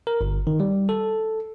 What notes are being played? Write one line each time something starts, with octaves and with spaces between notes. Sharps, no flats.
A#4
G1
D#3
G3
A4